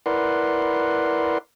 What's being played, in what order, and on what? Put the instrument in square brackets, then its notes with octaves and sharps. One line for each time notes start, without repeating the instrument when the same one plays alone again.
[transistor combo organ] E4 A#4 B4 D5 F#5 C6